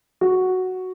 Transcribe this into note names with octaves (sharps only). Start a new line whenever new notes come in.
F#4